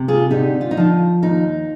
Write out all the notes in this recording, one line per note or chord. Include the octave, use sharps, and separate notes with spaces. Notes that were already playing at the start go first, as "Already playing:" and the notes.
Already playing: C3
F4 G#4
D3 D#4 G4
F4
D#4
F3 F4
D#2 D#4